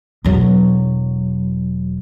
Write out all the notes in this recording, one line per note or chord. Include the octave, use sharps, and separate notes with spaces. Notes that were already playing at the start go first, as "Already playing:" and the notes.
E1 F#3